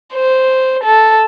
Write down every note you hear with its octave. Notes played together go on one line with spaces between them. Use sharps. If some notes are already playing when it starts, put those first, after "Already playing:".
C5
A4